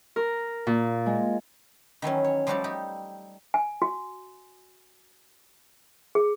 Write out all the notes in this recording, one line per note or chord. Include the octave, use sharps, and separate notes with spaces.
A#4
A#2
G#3
D#3 E3 F#3 C#4
C#5
F3 G3 A3 F#4 G4 D5
D#4 G4
G#5
F#4
G#4